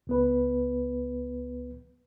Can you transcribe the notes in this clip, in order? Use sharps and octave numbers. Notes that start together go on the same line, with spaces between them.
C#2 B3 B4